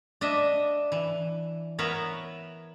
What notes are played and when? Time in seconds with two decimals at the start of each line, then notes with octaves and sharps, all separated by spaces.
0.21 D4 D#5 E5
0.92 E3
1.79 B3 A#4 B4 C#5 E5